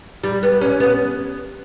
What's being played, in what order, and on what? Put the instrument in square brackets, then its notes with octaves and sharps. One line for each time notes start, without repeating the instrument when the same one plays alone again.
[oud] G3
B3
C#4
B3